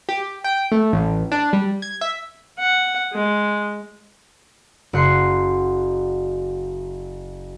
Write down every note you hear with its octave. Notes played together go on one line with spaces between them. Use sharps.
G4
G5
A3
A1
D4
G3
G#6
E5
F#5
G#3
F#1 F#5 C6 C7